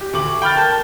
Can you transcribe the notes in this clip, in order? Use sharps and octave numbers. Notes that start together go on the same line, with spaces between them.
G4
D2 C#6 D6 F#7
G5 B5 F6 A6
A#4 A5 G6